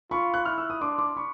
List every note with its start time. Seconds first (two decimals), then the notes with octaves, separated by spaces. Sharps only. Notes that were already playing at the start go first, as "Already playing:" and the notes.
0.11 F4 B5 C#6
0.34 F#6
0.45 E4 F6
0.58 E6
0.70 D#6
0.81 D4 C6 D6
0.99 C6 D6
1.17 B5 C#6